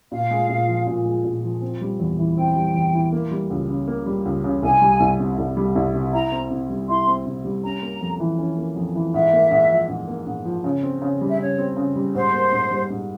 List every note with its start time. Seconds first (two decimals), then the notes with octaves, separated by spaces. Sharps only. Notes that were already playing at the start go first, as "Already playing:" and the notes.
0.12 A#2 F5
0.31 G#3
0.49 A#2
0.68 F3
0.87 A#2
1.05 G#3
1.24 A#2
1.43 F3
1.62 C4
1.81 G3
2.00 E2
2.18 E3
2.37 C4 G5
2.56 G3
2.74 E2
2.94 E3
3.13 A#3
3.31 G3
3.50 C#2
3.69 C#3
3.88 A#3
4.06 G3
4.25 C#2
4.44 C#3
4.63 C2 G#5
4.82 G3
5.00 C2
5.19 C3
5.38 C2
5.57 G3
5.75 C2
5.94 C3
6.13 E4 A#5
6.32 C4
6.51 C3
6.70 G3
6.88 E4 C6
7.07 C4
7.26 C3
7.45 G3
7.64 C#4 A#5
7.82 A#3
8.01 F2
8.20 E3
8.39 C#4
8.57 A#3
8.76 F2
8.95 E3
9.14 G#2 E5
9.33 A#3
9.51 G#2
9.70 F3
9.89 G#2
10.08 A#3
10.27 G#2
10.45 F3
10.64 C#3
10.83 C4
11.02 C#3
11.21 G3
11.30 E5
11.39 C#3 C#5
11.58 C4
11.77 C#3
11.96 G3
12.15 G#2 C5
12.33 A#3
12.52 G#2
12.71 G3
12.90 G#2